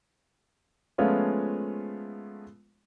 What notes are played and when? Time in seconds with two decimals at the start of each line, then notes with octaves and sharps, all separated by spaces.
0.98 F3 G#3 A3 B3 C#4 F4